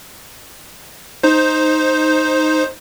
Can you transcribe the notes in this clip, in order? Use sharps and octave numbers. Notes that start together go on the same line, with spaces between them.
D#4 C5